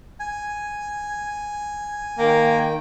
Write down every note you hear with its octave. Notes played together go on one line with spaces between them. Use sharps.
G#5
D#3 A#3 G5